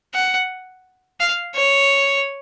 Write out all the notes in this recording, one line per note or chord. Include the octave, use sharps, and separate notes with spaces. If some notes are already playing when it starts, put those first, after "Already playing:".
F#5
F5
C#5